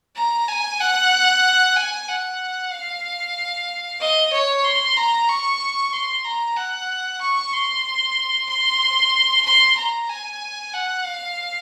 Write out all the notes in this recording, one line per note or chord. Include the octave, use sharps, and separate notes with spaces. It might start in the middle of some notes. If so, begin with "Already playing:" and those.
A#5
G#5
F#5
G#5
F#5
F5
D#5
C#5
C6
A#5
C#6
C6
A#5
F#5
C#6
C6
C6
C6
A#5
G#5
F#5
F5